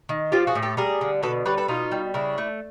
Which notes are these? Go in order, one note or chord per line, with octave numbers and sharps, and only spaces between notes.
D#3
F3 F4 G4
F#4 G#4
A2
G4 A4
G3 G#4 A#4
D3
B2 A4 B4
G3 B4 C#5
A4 B4
B2 D#4 F4
G3
C#3 D4 E4
A3